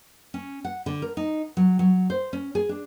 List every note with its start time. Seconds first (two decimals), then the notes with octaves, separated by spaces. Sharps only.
0.34 C#4
0.65 F#5
0.86 D3
1.02 A#4
1.17 D#4
1.57 F#3
1.79 F#3
2.10 C5
2.33 C#4
2.55 G#4
2.69 D4